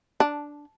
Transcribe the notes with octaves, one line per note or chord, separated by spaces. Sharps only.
D4